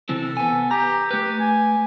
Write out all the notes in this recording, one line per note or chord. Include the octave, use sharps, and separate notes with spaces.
C3 E3 C4 A4
B3 G#5
G4 A#5
A3 G4 B4
G#5